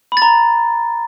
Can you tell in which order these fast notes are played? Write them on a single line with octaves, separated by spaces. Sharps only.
B5 A6 A#5